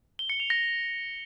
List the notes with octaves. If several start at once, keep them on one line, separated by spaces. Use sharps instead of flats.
G7
C#7
F7
A#6